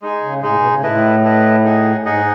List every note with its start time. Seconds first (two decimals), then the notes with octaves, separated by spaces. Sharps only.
0.02 G#3 D#4 G#4
0.22 C#3
0.42 A2 G#3 D#4 G#4
0.56 B2
0.69 C#3
0.83 A2 A3 E4 B4 D#5
1.23 A3 E4 B4 D#5
1.64 D#4 G#4 D#5 F#5
2.05 G#2 D#4 G#4 D#5 F#5